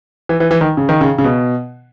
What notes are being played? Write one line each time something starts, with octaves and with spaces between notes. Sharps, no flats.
E3
E3
E3
D#3
C#3
D#3
C#3
C#3
B2